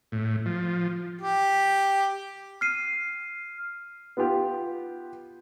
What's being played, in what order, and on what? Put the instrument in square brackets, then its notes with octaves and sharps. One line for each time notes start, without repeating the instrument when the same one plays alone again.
[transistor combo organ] A2
F3
[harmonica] G4
[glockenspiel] F6 C7 D#7
[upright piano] B3 F4 G4